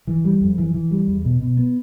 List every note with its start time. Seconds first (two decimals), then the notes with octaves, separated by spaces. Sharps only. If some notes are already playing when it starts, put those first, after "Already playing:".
0.07 E3
0.25 G3
0.41 F2
0.58 E3
0.74 E3
0.91 G3
1.08 E2
1.24 B2
1.41 B2
1.57 B3